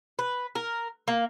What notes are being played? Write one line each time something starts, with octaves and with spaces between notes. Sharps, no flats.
B4
A#4
A#3